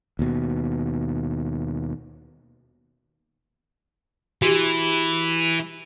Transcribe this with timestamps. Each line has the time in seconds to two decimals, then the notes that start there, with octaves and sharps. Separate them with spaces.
0.19 D#2 B2
4.42 E3 F#4 G4